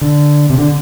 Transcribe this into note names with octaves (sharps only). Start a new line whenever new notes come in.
D3
C3
D3